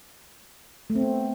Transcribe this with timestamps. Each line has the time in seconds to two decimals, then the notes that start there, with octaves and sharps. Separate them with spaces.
0.90 A3
0.95 C4
1.01 B3